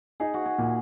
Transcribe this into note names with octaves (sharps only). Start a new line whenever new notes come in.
D#4 G#4
F#4
G#4
A#2